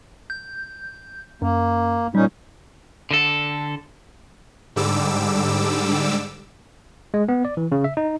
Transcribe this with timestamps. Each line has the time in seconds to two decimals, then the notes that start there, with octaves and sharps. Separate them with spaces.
0.30 G6
1.42 F#2 A#3
2.15 A#2 G3 C#4 D#4
3.11 D3 A4
4.76 G#2 D3 G3 D6 E6
7.14 G#3
7.29 B3
7.45 D5
7.57 E3
7.72 C#3
7.84 E5
7.97 D#4